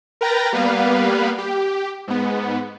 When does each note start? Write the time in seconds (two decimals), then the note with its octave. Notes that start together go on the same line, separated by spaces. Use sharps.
0.21 A#4 B4 G5 A#5 A6 A#6
0.52 G3 A#3 B3 B4 F5
1.38 G4
2.08 G#2 B3